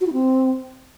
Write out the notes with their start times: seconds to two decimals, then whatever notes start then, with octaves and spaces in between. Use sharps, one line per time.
0.01 F#4
0.07 E4
0.13 C4